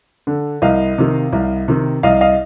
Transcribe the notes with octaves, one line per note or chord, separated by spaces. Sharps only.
D3
C2 D#5 F5
C3 D#3
C2
C3 D#3
C2 D#5 F5
D#5 F5